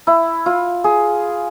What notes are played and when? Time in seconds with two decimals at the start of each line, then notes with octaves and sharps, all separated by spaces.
0.07 E4
0.46 F4
0.84 G#4